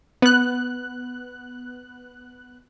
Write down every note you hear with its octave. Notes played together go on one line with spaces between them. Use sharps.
B3 F#6